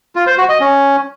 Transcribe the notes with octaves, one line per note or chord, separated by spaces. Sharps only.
F4
C5
F#4
D#5
C#4